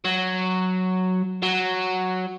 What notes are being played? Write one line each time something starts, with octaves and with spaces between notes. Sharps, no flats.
F#3
F#3